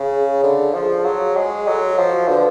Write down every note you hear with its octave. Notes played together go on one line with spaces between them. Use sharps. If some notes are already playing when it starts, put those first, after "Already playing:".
Already playing: C#3 G#4
D3
F3
F#3
G#3
F#3 A4
F#4
F3
F#4
D3 B4